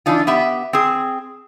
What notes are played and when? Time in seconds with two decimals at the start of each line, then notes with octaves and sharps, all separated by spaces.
0.06 E3 D4 D#4 F4
0.27 B3 G4 E5
0.73 C4 G#4